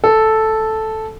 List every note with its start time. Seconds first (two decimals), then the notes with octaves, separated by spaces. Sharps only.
0.04 A4